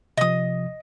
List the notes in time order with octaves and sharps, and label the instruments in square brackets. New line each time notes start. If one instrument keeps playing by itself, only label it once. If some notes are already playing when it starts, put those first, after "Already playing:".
[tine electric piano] C3 F3 [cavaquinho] D#5 D#6